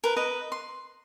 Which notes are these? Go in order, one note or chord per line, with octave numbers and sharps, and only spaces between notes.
A#4 B4
B4 D#5 A#5
C6